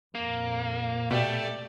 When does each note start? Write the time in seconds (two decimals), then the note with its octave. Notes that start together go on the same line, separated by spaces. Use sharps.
0.15 F2 A#2 A#3
1.11 B2 A3 G4 D5